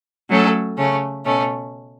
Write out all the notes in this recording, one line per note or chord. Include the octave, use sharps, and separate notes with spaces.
F#3 A3 C#4 A4
C#3 A3 C#4
B2 A3 C#4